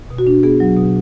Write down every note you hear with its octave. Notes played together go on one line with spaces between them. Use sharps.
B2
F#4
D4
B3 G#4
F#3
B2